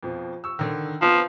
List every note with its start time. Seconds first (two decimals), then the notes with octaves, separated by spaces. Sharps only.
0.03 F2 B2 F3
0.44 C#6 E6
0.59 D3 D#3
1.02 F3 B3 C4